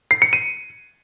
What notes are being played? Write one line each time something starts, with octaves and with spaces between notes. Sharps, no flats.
C7
C#7
D#7